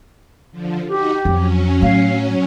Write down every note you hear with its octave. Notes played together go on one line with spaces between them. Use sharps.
D3 F3
D#4 F#4 G4
F2 F#3 C#4
A2 F5